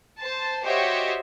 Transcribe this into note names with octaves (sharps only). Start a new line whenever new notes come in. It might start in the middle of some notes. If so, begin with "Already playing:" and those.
C5 A5
F#4 G4 C5 C#5 D#5 E5